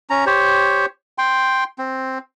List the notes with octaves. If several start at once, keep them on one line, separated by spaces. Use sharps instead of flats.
C#4 A#5
G4 C5 C#5
G5 C6
C4